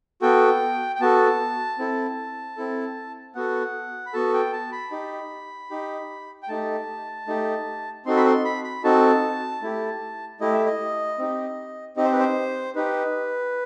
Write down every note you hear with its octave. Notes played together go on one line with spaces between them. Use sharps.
B3 F#4 A4 G5
G5
B3 F#4 A4 A5
C4 E4 A4
C4 E4 A4
B3 F#4 A4 F#5
B5
B3 F#4 A4 A5
G5
A5
B5
D#4 G4
D#4 G4
G5
A3 D#4 G4 A5
A3 D#4 G4
C4 D#4 F#4 A4 C6
B5
C6
B5
B5
C4 D#4 F#4 A4 A5
A3 E4 G4
A3 E4 G4 D#5
E5
D#5
C4 D#4 G4
C4 D#4 G4 D#5
C5
B4
C5
D#4 G4 B4